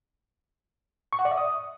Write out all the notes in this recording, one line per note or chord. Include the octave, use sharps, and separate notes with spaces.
C#6
F#5
D5
E5
D#6